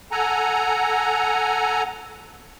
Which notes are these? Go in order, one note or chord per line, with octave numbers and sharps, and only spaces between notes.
A4 F#5 G#5 A#5